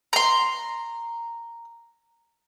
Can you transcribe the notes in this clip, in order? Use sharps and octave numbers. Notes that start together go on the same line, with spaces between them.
A#5 C6